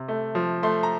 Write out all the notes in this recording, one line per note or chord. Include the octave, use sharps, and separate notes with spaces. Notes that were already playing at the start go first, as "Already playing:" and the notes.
Already playing: C3
A3
F3
A3 C6
A#5